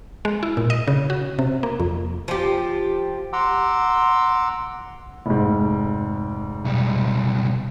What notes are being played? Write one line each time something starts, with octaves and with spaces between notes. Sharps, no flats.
G#3
E4
A#2
D#5
C#3
F#4
C3
A#3
F2
F3 G4
F#5 A#5 C6 D6 E6
F1 G#2
B1 G3